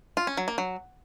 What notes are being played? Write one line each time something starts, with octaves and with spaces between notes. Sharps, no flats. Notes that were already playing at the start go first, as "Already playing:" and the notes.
F4
C#4
F#3
A#3
F#3